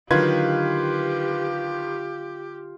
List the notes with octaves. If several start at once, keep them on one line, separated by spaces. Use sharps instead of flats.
D3 D#3 F#3 F4 G4 B4 G#6